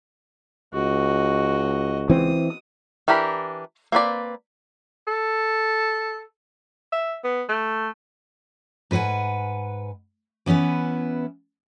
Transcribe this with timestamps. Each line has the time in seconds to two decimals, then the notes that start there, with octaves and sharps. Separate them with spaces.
0.74 C#2 F#4 D#5
2.10 E3 C4 D#6
3.08 E3 D4 G4 A#4 B5
3.92 A#3 C4 B4 D5
5.07 A4
6.92 E5
7.24 B3
7.49 A3
8.91 G#2 B4 C5 F#5 G#5
10.46 E3 B3 C#4 E4 B4